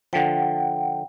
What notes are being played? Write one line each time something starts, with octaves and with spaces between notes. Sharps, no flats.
D3 F3 F#5 G5